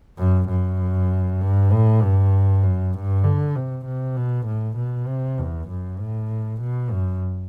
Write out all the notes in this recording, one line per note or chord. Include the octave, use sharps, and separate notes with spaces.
F#2
F#2
G2
A2
G2
F#2
G2
D3
C3
C3
B2
A2
B2
C3
E2
F#2
A2
B2
F#2